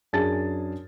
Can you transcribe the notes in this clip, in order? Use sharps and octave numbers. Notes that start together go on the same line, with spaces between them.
F#2 D4 G#4 A5 A6